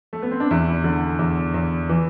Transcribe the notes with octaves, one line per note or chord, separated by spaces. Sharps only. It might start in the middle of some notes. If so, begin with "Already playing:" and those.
A3
B3
C4
D4
E2 E4
D3
E2
E2
E3